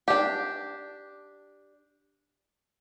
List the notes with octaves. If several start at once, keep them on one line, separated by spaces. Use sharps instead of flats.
D4 G4